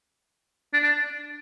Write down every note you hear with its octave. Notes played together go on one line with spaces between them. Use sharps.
D4
D4